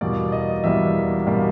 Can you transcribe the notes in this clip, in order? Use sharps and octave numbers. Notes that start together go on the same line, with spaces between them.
E2 B2 G3 A#3 D5
D#5
E2 B2 G3 A#3 E5
B2 G3 A#3